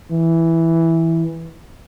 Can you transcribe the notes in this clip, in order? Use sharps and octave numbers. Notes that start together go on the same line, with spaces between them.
E3